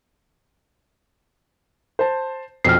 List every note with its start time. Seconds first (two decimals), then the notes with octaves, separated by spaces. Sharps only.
1.99 C5 A5
2.64 A#1 F2 B2 F6 C7